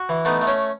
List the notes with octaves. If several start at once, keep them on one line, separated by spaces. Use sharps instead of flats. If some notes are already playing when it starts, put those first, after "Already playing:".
Already playing: F#4
E3
A3 B3 D#4
A3
C#4